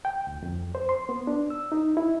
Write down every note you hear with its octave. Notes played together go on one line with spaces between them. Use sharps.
G5
D2
F2
C5
C6
B3
D4
E6
D#4
E4